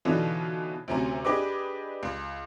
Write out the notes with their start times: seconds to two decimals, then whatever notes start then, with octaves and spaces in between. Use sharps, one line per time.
0.05 B2 D3 E3 F#3 D#4 F4
0.88 D2 C3 F#3 C#4 G#5 A#5
1.25 D4 G4 G#4 B4 D#5 D6
2.03 C#2